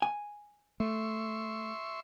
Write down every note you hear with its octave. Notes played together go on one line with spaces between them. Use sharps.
G#5
A3 E5 C6 C#6